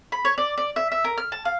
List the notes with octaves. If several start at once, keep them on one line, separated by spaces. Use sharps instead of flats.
B5
C#5
D5
D5
E5
E5
A#4
F6
A5
F5